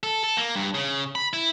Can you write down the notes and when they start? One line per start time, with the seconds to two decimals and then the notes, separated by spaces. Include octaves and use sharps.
0.03 A4
0.24 A4
0.37 A#3
0.56 G2
0.74 C#3
1.15 B5
1.33 E4